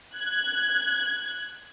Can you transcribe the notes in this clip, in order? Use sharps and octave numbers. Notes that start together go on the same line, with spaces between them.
F#6 G#6